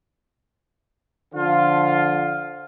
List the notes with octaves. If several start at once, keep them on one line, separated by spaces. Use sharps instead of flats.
D3 F3 F4